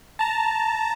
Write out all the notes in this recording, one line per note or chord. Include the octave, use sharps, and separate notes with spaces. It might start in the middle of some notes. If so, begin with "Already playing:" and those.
A5 A#5